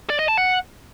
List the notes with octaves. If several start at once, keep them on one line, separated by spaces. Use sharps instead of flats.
D5
D#5
A5
F#5